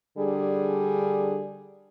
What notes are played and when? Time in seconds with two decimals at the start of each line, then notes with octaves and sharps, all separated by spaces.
0.16 D3 G3 D4 G#4